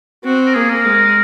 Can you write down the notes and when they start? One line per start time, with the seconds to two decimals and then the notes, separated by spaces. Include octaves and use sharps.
0.25 C4 F#4
0.47 A#4
0.54 A#3 G#4
0.70 A#4
0.85 G#3